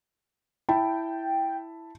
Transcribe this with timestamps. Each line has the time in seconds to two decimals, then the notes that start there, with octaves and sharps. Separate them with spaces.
0.69 E4 G5 A5 B5